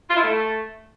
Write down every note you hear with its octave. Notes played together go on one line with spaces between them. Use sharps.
F4
E4
A3